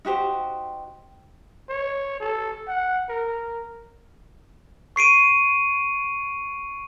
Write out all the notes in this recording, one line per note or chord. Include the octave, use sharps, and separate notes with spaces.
D#4 F#4 G4 C5
C#5
A4
F#5
A#4
C#6 C7 D7 D#7